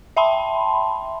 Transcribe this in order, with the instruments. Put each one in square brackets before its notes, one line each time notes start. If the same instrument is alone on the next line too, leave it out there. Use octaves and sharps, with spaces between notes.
[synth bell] E5 G5 A5 B5 C6